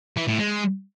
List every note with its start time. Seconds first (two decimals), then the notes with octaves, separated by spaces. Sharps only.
0.17 E3
0.28 A2
0.39 G#3